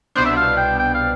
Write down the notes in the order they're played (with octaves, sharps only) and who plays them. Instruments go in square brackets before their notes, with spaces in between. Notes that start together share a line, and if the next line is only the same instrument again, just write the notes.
[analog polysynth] C2 B2 B3 D4 [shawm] C5
[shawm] E5
F5
G5
G5
F5